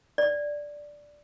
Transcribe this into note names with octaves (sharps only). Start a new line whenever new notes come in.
D5